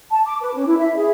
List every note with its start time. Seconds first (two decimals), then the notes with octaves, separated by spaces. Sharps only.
0.10 A5
0.25 D6
0.41 B4
0.54 C#4
0.67 E4
0.78 E5
0.96 G#4